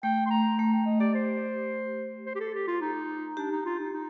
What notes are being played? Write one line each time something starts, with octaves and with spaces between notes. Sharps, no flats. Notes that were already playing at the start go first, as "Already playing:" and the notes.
A3 G5
C6
A#5
A3 A#5
G5
D#5
G4 D5
C5
C5
G4
A4
G4
F4
D#4
D4 G4
D#4
F4
D#4
D#4